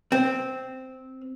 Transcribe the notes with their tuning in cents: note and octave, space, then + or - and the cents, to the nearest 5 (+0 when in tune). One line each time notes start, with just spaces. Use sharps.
C4 -5